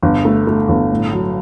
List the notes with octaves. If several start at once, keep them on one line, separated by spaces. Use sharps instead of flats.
G1
A3
A3
G1
A2
F#3